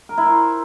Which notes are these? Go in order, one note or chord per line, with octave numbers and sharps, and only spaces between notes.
A#4
E4
C5